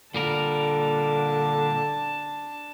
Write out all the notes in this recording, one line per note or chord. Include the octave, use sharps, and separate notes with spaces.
A#2 D3 G3 D4 A#4 A5